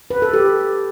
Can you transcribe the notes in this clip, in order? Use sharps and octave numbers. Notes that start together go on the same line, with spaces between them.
B4
A4
G4